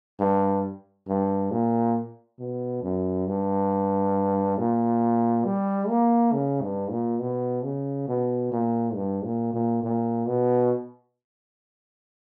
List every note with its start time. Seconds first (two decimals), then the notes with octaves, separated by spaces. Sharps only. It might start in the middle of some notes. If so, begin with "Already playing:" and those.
0.20 G2
1.08 G2
1.51 A#2
2.40 B2
2.83 F#2
3.27 G2
4.58 A#2
5.45 G3
5.89 A#3
6.33 C#3
6.62 G2
6.91 A#2
7.20 B2
7.64 C#3
8.08 B2
8.52 A#2
8.95 G2
9.25 A#2
9.54 A#2
9.83 A#2
10.27 B2